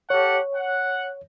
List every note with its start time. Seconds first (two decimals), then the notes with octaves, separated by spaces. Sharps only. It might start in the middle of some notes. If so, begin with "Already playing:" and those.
0.10 G4 A4 C#5 F#5
0.54 F#5